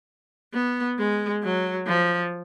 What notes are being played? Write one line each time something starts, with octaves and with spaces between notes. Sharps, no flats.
B3
G#3
F#3
F3